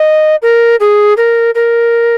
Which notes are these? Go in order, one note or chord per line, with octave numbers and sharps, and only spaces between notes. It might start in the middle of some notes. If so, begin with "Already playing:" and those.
Already playing: D#5
A#4
G#4
A#4
A#4